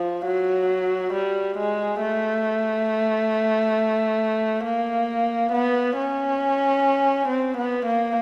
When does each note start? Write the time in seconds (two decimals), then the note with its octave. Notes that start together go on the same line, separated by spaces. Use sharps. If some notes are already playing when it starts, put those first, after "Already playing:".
Already playing: F3
0.26 F#3
1.14 G3
1.58 G#3
2.01 A3
4.64 A#3
5.52 B3
5.96 C#4
7.28 C4
7.57 B3
7.86 A#3